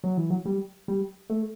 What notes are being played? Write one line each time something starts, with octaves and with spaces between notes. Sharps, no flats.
F#3
E3
F#3
G3
G3
A3